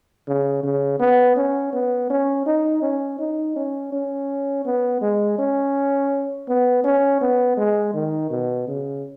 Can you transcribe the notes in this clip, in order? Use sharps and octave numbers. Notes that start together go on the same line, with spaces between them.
C#3
C#3
B3
C#4
B3
C#4
D#4
C#4
D#4
C#4
C#4
B3
G#3
C#4
B3
C#4
B3
G#3
D#3
B2
C#3